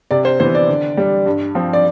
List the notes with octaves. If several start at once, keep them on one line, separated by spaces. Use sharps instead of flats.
C3 D5
C5
E3 B3 C5
D5
D3
G3 D4
G2
F3 C4
D5